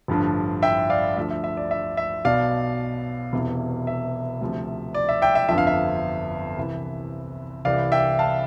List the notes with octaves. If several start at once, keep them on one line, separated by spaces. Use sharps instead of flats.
A1 G2 D3 F3
E5 G5
D5 F5
D2 D3 F3 E5
E5
E5
D5
E5
E5
B1 B2 D5 F5
E1 E2 C3 E3
E5
D2 C3 F3
D5
E5
E5 G5
E5
G1 F2 D3 F3 E5
F5
E5
C2 C3 E3
C2 C3 E3 D5 F5
E5 G5
F5 A5